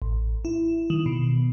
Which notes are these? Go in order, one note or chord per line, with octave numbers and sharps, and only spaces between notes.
A1
E4
D#3
B2